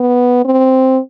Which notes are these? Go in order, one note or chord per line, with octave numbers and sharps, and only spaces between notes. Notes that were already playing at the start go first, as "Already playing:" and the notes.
Already playing: B3
C4